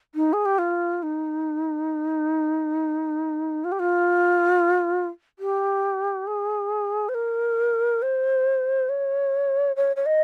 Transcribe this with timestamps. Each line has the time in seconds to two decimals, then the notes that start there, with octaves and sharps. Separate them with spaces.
0.15 D#4
0.33 G#4
0.45 G4
0.59 F4
1.03 D#4
3.64 F4
3.72 G4
3.79 F4
5.39 G4
6.27 G#4
7.09 C5
7.14 A#4
8.02 C5
8.89 C#5
9.76 C#5
9.96 C#5
10.06 D#5